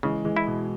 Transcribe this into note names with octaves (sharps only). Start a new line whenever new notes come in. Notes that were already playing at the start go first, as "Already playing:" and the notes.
C#3 E3 G#3
E3 G#3
E4
B2